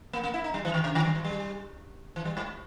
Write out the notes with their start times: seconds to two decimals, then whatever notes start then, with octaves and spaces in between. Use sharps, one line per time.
0.13 A#3
0.24 A#3
0.34 E4
0.44 D#4
0.54 G3
0.65 E3
0.74 D#3
0.84 C#3
0.95 D#3
1.05 G3
1.15 E3
1.25 G3
2.16 E3
2.25 G3
2.37 G#2